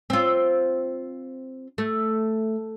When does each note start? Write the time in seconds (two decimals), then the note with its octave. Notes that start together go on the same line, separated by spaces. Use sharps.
0.10 C4 F4
1.78 A3